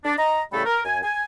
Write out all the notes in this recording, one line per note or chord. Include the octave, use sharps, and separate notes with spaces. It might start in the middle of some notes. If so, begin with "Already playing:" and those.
D4
D#5 A#5
A2 C#3 G3 A3 A4 B5
A#4
F#2 G#5
G#5